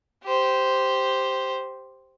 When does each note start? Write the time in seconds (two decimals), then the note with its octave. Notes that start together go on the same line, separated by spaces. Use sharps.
0.24 G4 C5